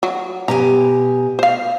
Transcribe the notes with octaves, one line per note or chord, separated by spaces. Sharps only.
F#3
B2 G4 G#5 A#5
C5 F5